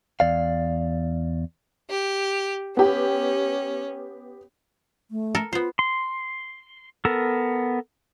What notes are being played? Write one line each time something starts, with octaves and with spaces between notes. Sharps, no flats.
E2 D5 F5
G4
B3 C#4 G4
A3
A4 A#4 A5
B3 F4 C5
C6
B3 A4 A#4